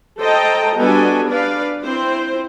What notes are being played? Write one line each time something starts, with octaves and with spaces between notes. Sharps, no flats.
A4 C5 D#5 G5 A5 A#5
G3 B3 D4 F#4 A4 G#5
D4 B4 D5 F5
C4 E4 C5